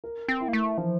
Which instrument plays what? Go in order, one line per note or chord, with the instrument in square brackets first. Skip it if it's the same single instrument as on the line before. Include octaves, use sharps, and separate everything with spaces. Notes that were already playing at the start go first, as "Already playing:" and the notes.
[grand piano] A#4
[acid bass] C4
[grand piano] E4
[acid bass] A#3
A3
[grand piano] E3 [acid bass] F3